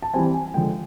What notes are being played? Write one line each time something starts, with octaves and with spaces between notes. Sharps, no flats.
A5
E3 G3 C4 G#5
G#5
D3 F3 G#3 G5